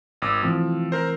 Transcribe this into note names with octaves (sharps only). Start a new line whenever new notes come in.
G#1 D6 E6
E3 F3 A3 C4
A#4 C5